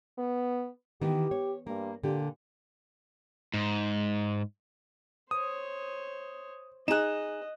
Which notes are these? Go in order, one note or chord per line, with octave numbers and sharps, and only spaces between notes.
B3
D#3 E3 B3 G4
C#5
G2 A#3
A#2 D3 G4
G#2
C5 C#5 D#6
D#4 G#4 D#5 F#6 E7